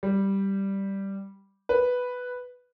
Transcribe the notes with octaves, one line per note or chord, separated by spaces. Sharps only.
G3
B4